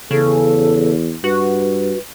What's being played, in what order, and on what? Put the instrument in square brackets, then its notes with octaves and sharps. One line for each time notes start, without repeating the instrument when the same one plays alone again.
[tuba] E2 [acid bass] C#3 [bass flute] A4
[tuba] G2 [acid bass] F#4 [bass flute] B4